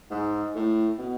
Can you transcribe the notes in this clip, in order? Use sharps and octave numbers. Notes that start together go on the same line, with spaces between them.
G#2
A2
B2